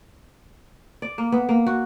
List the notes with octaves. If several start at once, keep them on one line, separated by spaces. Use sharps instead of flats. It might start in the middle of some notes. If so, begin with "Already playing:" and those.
D5
A#3
B3
A#3
F#4